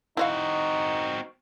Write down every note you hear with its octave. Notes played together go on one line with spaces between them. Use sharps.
C4 D#4 E4 F#4 D#5 F5